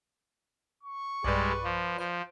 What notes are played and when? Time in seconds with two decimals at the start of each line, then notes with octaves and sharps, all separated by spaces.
0.83 C#6
1.24 B1 G2 G3 G#3 B4 D5
1.64 F3
1.98 F3 C5 G6 D7